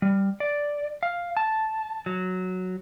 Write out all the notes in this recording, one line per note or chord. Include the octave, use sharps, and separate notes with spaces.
G3
D5
F5
A5
F#3